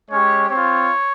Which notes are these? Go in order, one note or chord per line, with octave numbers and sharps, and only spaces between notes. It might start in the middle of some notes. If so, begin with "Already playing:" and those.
G#3 C#4 G4 C#5
C4 C#5
F4